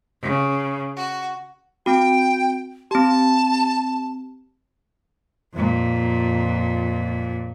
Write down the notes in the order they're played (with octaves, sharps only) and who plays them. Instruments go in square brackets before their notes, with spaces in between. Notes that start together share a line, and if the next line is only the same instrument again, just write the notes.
[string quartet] C#3
F#4
[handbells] C4 F#4 [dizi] G5
[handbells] C4 G4 [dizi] A5
[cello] F2 A#2